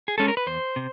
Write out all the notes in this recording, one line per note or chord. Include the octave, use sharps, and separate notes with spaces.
G#4
G#3 C#4 A4
A#4
B4
E2 C5
C3